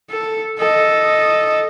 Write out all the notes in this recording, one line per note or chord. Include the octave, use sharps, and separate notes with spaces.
A4
A4 D#5